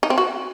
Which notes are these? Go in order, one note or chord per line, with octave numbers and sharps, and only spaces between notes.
D#4
C4
F#4